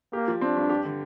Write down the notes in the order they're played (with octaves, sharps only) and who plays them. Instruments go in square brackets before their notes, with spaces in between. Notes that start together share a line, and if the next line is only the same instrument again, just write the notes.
[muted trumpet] A#3 [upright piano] G4
[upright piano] F3
[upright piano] C4 [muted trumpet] D4
[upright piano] G2
G4
D3